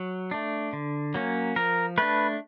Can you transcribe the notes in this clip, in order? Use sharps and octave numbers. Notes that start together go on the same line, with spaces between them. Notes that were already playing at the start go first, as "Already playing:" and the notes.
Already playing: F#3
A3 D4
D3
F#3 A#3 C#4
F3 A#4
A3 D4 B4